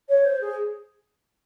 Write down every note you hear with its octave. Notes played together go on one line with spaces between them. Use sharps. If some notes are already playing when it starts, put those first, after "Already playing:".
C#5
C5
G#4